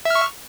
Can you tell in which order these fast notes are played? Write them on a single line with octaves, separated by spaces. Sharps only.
E5 F6 C#6